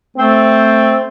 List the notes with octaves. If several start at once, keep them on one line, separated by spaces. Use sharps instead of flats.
A3 C4